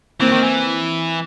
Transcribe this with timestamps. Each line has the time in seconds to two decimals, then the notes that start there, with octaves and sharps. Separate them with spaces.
0.20 E3 A#3 C4
0.32 D#3
0.43 E3